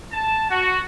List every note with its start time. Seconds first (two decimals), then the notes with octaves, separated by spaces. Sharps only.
0.12 A5
0.50 F#4